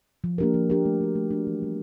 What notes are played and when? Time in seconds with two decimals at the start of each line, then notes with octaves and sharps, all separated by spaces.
0.24 F3
0.38 A#3 D4 G4 A#4
0.54 F3
0.70 A#3 D4 G4 A#4
0.85 A3
1.01 D4 F#4
1.15 A3
1.31 D4 F#4
1.47 E3
1.62 G3 B3